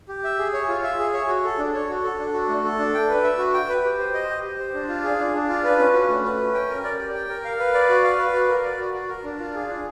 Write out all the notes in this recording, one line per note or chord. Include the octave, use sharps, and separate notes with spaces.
G4
E5
G#4
C#5
F4
E5
G#4
C#5
F#4
A4
D4
C#5
F#4
A4
D4
F#4
A3
A4
D4
G5
B4
E5
F#4
G5
B4
G4
C5
D#5
G4
G4
C5
D4
F4
G#4
D4
D4
F4
B4
C#4
F#4
A3
B4
C#4
G5
A#4
D5
G4
G5
A#4
F5
B4
D5
F#4
F5
B4
F#4
A#4
D5
F#4
F#4
A#4
D4
F4
G#4
D4